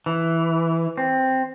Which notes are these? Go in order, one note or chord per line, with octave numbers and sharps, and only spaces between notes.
E3
C4